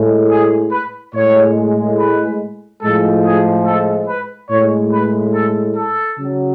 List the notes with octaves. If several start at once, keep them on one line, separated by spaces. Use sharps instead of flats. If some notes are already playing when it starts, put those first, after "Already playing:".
Already playing: A2 G#3
G#4
B4
A2 G#3 C#5
B4
A2 F3 G#3 A4
G#4
A4
B4
A2 G#3 C#5
B4
A4
A4
C#3 F#3